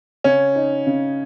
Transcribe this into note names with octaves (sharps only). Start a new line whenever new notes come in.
C#3 C#4
D#4
C#3